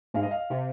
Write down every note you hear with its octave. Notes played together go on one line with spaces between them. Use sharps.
G#2 F5
D#5
F5
C3